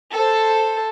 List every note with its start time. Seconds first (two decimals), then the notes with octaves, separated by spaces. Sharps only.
0.13 A4 C5